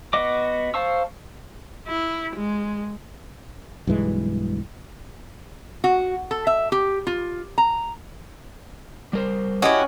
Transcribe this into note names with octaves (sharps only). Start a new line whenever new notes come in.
B3 F#4 D#5 D6
C5 F5 A5 C#6 E6
E4
G#3
B1 G2 E3 G#3
F#4
A4
E5
G4
F4
A#5
G3 A#4 C5
C#4 E4 F#4 G4 C#5 D#5